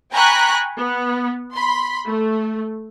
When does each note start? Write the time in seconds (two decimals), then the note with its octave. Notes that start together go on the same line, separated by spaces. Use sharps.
0.13 G5 G#5 A#5 B5 C#6 F#6
0.77 B3
1.54 B5 C6
2.07 A3